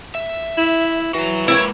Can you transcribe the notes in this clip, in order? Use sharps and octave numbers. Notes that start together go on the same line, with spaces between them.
E5
E4
E3 F#3 F#4
G#3 E4 G4 A#4 B4 C#5